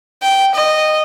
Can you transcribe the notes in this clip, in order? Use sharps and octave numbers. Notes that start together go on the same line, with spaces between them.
G5
D#5